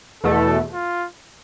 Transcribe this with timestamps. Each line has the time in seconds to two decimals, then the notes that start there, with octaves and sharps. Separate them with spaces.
0.23 E2 B2 A3 A4
0.73 F4